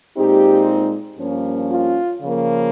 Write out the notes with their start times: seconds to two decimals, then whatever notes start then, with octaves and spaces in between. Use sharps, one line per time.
0.16 A#2 G#3 C4 D#4 G4
1.19 G2 F3 A#3 C#4
1.71 F4
2.22 C#3 F3 A#3